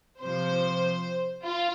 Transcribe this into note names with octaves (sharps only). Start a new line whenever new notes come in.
C3 F3 C5
F4